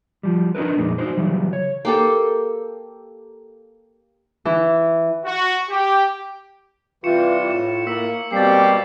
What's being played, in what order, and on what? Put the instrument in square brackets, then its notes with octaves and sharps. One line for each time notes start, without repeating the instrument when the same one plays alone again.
[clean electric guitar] F3 G3
D4 D#4 G#4 A#4 B4
F2 A#2 G#3 A#3
D#4 F#4 C5
C#3 E3 F#3 G3
C#5
[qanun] A#3 G4 A4
[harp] E3
[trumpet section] F#4
G4
[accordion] C3 E3 G3 [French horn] F4 [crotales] C#6 C#7 E7
[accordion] A2 [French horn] F4 [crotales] E7
[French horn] A#3 [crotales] E6 B6
[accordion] B2 G3 A#3 [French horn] C4 [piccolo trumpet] G4 [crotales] A6 B6 C7